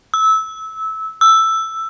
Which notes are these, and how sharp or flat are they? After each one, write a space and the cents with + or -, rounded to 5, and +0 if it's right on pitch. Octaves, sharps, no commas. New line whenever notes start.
E6 -20
E6 +5